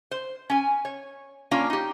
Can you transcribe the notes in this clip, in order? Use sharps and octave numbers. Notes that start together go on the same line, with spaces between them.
C5
C#4 G#5
C#5
A#3 C#4 D4 F4
D#4 G4